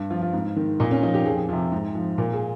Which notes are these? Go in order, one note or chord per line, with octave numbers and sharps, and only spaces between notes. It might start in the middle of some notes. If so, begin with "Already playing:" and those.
Already playing: G2
F3 F4
F4
G#2
D#3
A#2 D#4
C#4
F3 D#4
G4
F2 G#4
C3 F3
G#2
F3
A#2 A#4
G#4